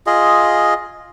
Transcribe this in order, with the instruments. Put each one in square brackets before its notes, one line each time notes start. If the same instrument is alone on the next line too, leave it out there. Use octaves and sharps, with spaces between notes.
[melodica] F4 G#4 D#5